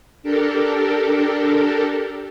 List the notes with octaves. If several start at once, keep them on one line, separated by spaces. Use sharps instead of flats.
D4 G4 A4 A#4